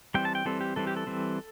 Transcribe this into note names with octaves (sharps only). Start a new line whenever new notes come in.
E3 G3 C4 G5
A5
G5
E3 G3 C4 A4
G4
E3 G3 C4 A4
G4
A4
E3 G3 C4